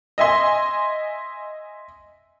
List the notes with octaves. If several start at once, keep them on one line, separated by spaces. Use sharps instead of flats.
D#5 E5 G#5 C6